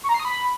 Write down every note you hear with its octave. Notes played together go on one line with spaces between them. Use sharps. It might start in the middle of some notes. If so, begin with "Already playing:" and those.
C#6
A#5
C7
D#6
B5